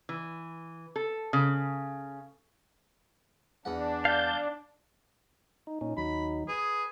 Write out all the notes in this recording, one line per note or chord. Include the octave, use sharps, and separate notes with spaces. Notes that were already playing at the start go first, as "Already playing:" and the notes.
E3
A4
C#3
E2 D4 F#5
F5 A5 G6
D#4
A#2 C#4 D#4
D#2 F#3 D#4 B5
G#4 B4